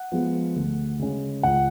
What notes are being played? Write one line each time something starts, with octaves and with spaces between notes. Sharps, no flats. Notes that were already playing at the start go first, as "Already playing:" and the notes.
Already playing: F#5
F3 G#3 B3
D2
C#3 G#3 C#4
C#2 F#5